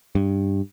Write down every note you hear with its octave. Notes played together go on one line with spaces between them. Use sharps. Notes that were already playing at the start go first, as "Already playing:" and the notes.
G2